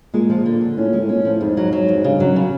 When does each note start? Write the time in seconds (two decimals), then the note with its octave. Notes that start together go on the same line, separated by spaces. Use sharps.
0.14 A#2 G#3
0.30 F3
0.46 D3
0.61 D3
0.77 A2 C#4
0.88 A#2 G#3
1.00 A2
1.09 A#2 C#4
1.22 A2 F3
1.41 F2 G#2
1.57 F#3
1.72 F#3
1.89 F2
1.97 G#2
2.04 G2 C#3
2.20 F#2 F#3
2.36 C#3